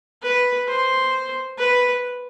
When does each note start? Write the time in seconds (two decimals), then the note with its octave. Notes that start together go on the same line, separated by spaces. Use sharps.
0.22 B4
0.67 C5
1.58 B4